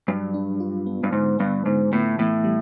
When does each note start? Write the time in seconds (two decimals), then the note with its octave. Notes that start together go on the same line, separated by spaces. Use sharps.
0.08 G2 F#3
0.34 D4
0.60 F4
0.86 B3
1.03 G2
1.12 G#2 D3
1.39 G2 B3
1.66 G#2 D3
1.92 A2 B3
2.19 A2 E3
2.44 G3